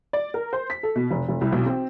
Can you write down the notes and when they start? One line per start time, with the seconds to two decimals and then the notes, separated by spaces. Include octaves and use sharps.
0.13 D5
0.34 A#4
0.53 C5
0.70 B6
0.83 A4
0.96 B2
1.11 F1
1.28 F1
1.41 C2
1.52 B1
1.66 C4